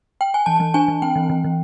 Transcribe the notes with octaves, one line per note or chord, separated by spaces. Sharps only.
G5
G#5
E3 A5
E3
D4 G#5
E3
C4 G5
E3
E3
E3